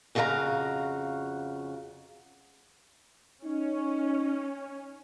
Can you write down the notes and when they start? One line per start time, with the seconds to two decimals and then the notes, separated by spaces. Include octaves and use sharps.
0.15 F2 C#3 F#4 A4 F5 A#5
3.45 C#4 D#4